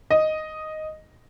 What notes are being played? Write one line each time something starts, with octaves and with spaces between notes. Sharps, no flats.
D#5